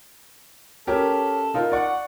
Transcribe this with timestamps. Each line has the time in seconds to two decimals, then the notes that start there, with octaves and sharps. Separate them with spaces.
0.87 C#4 G4 A4 A#4
1.54 D#4 F4 A#4
1.72 D5 F#5 C#6